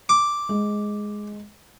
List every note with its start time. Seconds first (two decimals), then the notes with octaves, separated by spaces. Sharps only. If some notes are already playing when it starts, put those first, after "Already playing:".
0.09 D6
0.49 G#3